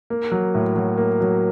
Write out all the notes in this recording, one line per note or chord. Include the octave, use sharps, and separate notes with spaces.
A#3
F#3
A2
F#3
A#3
F#3